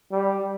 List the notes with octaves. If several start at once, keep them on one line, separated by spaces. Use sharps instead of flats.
G3